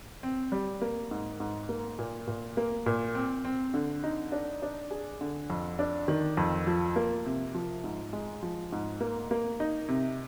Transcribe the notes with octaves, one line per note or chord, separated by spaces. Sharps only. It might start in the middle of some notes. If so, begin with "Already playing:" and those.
C4
G3
A#3
G#2
G#2
A#3
A#2
A#2
A#3
A#2
C4
C4
D3
D#4
D4
D4
G#4
D3
F2
D4
D#3
F2
F3
A#3
C3
F3
G#2
G#3
F3
G#2
A#3
A#3
D#4
C3